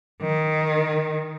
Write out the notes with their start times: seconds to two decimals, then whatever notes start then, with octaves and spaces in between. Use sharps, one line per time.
0.22 D#3